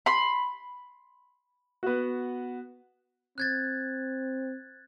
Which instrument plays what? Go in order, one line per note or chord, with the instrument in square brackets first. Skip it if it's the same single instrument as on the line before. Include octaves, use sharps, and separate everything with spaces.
[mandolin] B5 C6
[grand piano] B3 F#4
[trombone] C4 [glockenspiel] F#6 G#6 A6